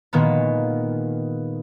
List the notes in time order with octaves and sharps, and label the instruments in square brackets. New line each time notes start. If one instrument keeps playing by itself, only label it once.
[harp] A#2 D#3 G#3 A#3 B3